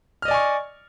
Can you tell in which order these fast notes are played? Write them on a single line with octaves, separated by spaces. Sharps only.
F6 D#5 D5 G#5 C#6